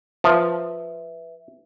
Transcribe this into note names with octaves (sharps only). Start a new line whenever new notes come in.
F3 B4 E5